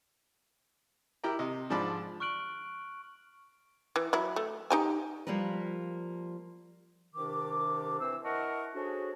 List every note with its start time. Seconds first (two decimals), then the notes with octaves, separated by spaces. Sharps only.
1.24 E4 G4 A#4 G5 A#5
1.39 C3 D#5
1.70 G#2 F3 D4 A5 B5 D6
2.20 C#6 F6 F#6 D7 F#7
3.96 E3
4.13 F#3 E4
4.36 A3
4.70 D#4 G4 G#5
5.27 F3 G3 A#3 A#4 B4
7.15 C2 C3 D#3 D4 D6
8.00 E3 C4 C5 E6
8.24 E4 A#4 D#5 F#5 A5 C#6
8.75 C#4 D4 F#4 G#4 A4 C5